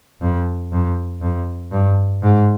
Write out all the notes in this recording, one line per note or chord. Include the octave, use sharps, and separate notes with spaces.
F2
F2
F2
G2
G#2